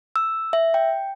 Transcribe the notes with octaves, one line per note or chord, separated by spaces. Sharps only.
E6
E5
G5